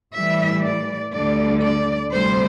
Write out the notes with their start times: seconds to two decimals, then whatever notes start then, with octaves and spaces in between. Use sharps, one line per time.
0.13 A2 E3 G3 E5
0.62 D5
1.12 D2 D3 G3 D5
1.61 D5
2.11 D2 C3 G3 C5